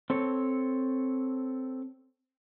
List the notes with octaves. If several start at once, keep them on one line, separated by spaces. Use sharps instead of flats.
C4 A4 C#5